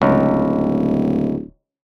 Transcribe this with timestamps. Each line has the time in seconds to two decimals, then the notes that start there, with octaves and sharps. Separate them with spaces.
0.02 D1 C#2